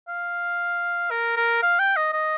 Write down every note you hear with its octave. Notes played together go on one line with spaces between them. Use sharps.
F5
A#4
A#4
F5
G5
D#5
D#5